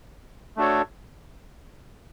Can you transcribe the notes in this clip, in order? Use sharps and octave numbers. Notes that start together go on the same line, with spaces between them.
A3 D4 F#4 A4 C#5